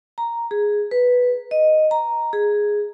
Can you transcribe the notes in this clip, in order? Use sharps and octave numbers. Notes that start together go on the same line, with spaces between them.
A#5
G#4
B4
D#5
A#5
G#4